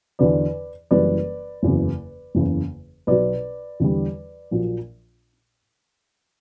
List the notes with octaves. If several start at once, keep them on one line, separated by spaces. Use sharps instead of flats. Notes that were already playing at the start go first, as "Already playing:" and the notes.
E2 D3 F#3 B4 D5
F#1 F#2 E3 G3 B4 D5
F#1 E2 C#3 F#3
F#1 E2 C#3
B1 B2 F#3 B4 D5
E2 D3 G3
A#1 A#2 F#3